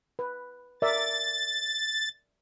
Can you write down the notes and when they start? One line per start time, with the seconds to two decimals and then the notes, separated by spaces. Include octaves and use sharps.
0.19 B4
0.82 A#4 D5 E5 A6